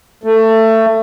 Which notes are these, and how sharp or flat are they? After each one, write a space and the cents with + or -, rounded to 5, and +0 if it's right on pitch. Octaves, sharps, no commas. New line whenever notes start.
A3 +20